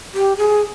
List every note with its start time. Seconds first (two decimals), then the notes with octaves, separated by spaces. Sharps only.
0.14 G4
0.37 G#4